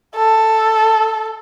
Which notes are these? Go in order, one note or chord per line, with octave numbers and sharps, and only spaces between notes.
A4